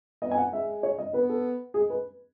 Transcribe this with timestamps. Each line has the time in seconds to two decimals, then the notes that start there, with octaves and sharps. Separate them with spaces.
0.22 B3 D#5
0.31 G#5
0.38 F#5
0.52 G#3 E5
0.83 C#5
0.98 D#5
1.14 B3 B4
1.30 A4
1.74 G#3 G#4
1.90 B4